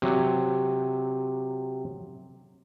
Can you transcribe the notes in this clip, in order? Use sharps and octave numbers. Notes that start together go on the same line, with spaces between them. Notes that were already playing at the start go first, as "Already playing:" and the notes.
C3 F#3